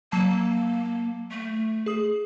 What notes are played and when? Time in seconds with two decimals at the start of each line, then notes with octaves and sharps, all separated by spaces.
0.12 F#3 A#3 A5
1.31 A3
1.86 G#4 D#6